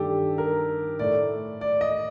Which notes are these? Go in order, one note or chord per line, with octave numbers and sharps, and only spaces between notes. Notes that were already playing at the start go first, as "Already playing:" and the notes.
Already playing: G2 D#3 A3 G4 A4
A#4
A2 A3 D5
D5
D#5